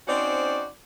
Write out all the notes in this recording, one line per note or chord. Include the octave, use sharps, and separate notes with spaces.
C4 C#4 D#4 F#4 C5 D5